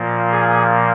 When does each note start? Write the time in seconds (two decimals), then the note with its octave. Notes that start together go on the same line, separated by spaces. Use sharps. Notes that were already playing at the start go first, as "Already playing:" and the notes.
Already playing: A#2 F3 A#3
0.32 G#4